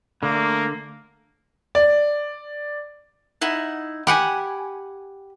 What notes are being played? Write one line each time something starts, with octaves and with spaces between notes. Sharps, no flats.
D3 A3 A#3
D5
D#4 E4 F#5
G4 F#5 G#5 B5